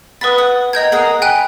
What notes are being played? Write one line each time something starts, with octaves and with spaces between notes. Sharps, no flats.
B4 D#5 F#5 B5 A6
F#5
A#4 D#5 G5 G6 G#6
G#4 A#4 F#5
G5 G#5 B5 F#6